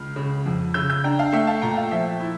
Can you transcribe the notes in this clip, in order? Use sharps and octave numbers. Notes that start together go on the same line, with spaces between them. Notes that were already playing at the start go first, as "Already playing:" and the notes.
Already playing: C#2 F6
C#3
F2
C#3 E6 G6
E6 G6
D4 G5 A#5
F5 A5
A3 E5 G5
F5 A5
A#2 G5 A#5
F5 A5
F3 E5 G5
E4